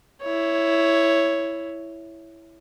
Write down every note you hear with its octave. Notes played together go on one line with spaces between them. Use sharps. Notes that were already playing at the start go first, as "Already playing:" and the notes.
E4 C#5